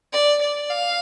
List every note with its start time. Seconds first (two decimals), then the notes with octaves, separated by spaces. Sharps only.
0.13 D5
0.41 D5
0.70 F5